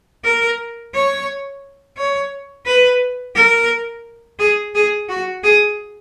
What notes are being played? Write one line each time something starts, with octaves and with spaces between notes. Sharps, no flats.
A#4
C#5
C#5
B4
A#4
G#4
G#4
F#4
G#4